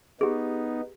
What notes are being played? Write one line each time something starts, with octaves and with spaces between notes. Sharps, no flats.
B3 D#4 G4 G#4